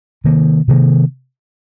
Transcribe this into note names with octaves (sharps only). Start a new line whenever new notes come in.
C3 D#3 A#3
C3 D#3 A#3